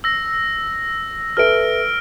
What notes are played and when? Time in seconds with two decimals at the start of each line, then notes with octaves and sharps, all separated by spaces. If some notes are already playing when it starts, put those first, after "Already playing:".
0.04 E6 A#6
1.37 A4 B4 E5 F6 D7